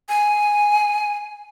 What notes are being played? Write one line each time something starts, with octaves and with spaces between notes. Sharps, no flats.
G#5